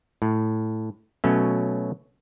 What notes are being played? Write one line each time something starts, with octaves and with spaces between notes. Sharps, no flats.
A2
B2 F#3 A3 C#4